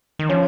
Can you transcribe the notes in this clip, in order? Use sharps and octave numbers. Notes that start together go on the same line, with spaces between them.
D#3
F3 C#4 C#5